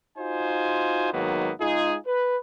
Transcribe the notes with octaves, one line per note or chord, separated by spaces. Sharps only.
D#4 F4 F#4 C5 G#5
G#2 D#3 F#3 A#3 B3
G#3 D#4 F4 G#4
B4